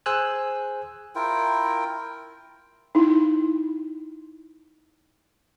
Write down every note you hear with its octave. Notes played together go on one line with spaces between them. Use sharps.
G#4 C5 G#5 E6 F#6
E4 F4 A#4 G5
D#4 E4